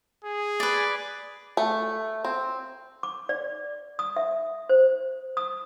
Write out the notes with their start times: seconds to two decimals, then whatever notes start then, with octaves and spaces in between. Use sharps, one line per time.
0.24 G#4
0.60 B4 D5
1.57 A3
2.25 C4
3.03 D6
3.29 D5
3.99 D#6
4.16 E5
4.69 C5
5.37 D#6